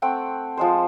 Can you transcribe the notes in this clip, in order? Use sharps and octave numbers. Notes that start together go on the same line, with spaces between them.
A3 C4 F#5 G5
F3 G#3 C5